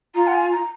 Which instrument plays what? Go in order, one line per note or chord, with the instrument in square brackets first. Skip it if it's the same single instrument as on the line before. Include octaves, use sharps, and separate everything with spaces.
[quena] F4 [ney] A#5
[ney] F#5
G#5
A#5